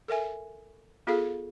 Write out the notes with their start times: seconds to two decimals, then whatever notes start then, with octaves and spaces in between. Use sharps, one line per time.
0.08 A4 A#4 E5 G#5
1.07 B3 F4 G#4 A4 F5